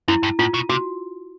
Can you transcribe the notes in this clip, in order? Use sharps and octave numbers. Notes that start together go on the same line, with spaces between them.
F#2 E4
G2
A2 F4
B2
C3 F#4